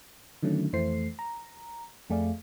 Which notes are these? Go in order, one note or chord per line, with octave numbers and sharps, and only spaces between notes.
D3 D#3 F#3 A3 C#4
F2 E3 A3 C5 C7
A#5
F2 A3 G#4 D5 F5